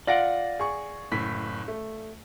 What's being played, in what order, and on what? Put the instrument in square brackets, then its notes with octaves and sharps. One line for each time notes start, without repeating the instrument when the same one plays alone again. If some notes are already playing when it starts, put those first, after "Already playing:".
[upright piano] F4 A#6 D7 [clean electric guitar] D5 F5 F#5
[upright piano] G#4 C#6
F#1 A2 B6
A3